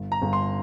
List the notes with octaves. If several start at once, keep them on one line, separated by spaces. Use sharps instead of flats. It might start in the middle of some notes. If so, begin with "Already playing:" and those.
Already playing: G1
A#5
G1
C6